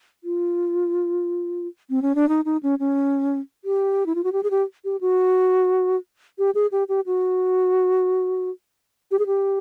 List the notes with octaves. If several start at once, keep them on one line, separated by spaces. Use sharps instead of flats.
F4
C4
C#4
D4
D#4
D#4
C#4
C#4
G4
E4
F4
F#4
G4
G#4
G4
G4
F#4
G4
G#4
G4
G4
F#4
G4
G#4
G4